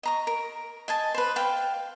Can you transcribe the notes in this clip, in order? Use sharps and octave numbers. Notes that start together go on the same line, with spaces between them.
D#5 A#5 C#6
A#4
D#5 G#5 A5
B4 C5
F5 G5